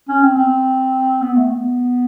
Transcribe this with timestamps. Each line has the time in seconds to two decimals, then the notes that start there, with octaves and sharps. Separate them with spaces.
0.09 C#4
0.23 C4
0.37 C4
1.22 B3
1.37 A3
1.51 B3